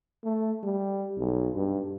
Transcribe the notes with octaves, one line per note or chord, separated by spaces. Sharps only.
A3
G3
B1
G2